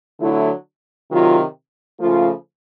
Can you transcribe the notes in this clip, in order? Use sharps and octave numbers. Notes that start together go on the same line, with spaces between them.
D3 F#3 A3 E4
C3 D#3 F#3 F4
C#3 F3 A3 F4